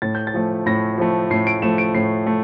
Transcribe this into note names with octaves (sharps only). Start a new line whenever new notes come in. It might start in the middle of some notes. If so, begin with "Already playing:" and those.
A2 A6
G6
A6
F3 A3
A2 A#6
F3 A3
A2 C7
D7
F3 A3 E7
D7
A2 C7
A3